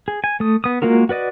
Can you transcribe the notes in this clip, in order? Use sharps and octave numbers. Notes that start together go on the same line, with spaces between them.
G#4
G#5
A3 D#6
B3 D#6
G#3 A#3 F4 F#4 A#4
F#4 B4 D5 D#5